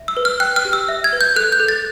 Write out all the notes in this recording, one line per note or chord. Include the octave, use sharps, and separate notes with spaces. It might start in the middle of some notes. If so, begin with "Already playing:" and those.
Already playing: E5
E6
B4
F6
G5 F#6
F6
G4
E6
E5
G#6
B4
G6
A4 F#6
G6
A4
A6